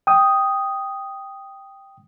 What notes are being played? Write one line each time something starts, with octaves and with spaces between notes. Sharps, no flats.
G5 D#6